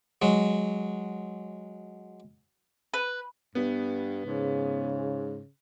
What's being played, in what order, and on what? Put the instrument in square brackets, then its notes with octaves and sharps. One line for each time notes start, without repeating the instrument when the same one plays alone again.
[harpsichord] F#3 G#3
[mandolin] B4
[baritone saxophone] G2 [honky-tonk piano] B3
[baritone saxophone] G#2 [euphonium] C#3